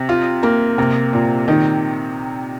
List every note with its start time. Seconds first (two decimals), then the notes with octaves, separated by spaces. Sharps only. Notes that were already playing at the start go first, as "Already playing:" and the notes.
Already playing: C3
0.09 F4
0.43 A#3
0.78 C3 A#3
1.13 A#2
1.48 D#3